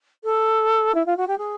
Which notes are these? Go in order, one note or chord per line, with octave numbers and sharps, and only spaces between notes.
A4
E4
F4
F#4
G4
G#4